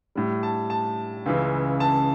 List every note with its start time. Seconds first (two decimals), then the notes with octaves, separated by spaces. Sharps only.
0.15 A2 G3
0.43 A5
0.70 A5
1.26 C#2 C#3 E3
1.80 A5